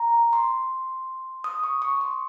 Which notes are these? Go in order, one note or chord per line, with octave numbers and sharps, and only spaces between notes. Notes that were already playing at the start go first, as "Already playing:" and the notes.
Already playing: A#5
C6
D#6
C#6
C#6
C6